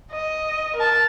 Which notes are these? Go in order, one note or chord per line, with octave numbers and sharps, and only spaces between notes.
D#5
A#4 A5